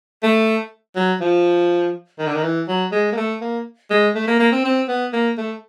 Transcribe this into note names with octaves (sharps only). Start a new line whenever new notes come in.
A3
F#3
F3
D#3
D3
D#3
E3
F#3
G#3
A#3
A3
A#3
G#3
A3
A#3
A#3
C4
C4
B3
A#3
A3